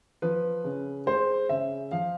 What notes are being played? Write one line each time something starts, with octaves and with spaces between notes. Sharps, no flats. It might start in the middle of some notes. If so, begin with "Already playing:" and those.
F3 B4
C#3
G#3 C5
C#3 E5
F3 F5